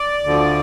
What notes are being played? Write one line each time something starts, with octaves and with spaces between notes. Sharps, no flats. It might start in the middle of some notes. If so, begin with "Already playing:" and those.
Already playing: D5
D2 D3 F3